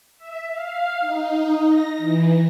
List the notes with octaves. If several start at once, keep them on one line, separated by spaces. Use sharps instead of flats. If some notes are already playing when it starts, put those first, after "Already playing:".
E5
F5
D#4
A#6
E3